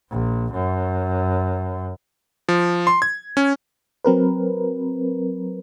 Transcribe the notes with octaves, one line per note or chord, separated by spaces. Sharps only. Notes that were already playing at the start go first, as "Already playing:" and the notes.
A#1
F#2
F3
C6
G#6
C#4
F#3 C4 A#4 B4